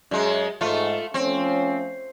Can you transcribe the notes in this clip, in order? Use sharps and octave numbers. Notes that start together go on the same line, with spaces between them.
F#2 G#3
G#2 A3 F4
F3 A3 C4 C#4